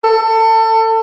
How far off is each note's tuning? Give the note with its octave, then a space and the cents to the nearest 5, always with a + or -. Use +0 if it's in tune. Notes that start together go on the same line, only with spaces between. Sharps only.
A4 +25